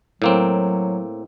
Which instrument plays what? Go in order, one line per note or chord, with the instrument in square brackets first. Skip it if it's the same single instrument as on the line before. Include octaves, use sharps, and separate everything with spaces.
[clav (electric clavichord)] A2 A#3 C4 [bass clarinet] F#3